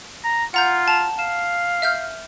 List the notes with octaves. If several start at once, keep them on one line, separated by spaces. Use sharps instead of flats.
A#5
F4 F#5 A#5 G6
A5 F7
F5 E7
E5 F6 G6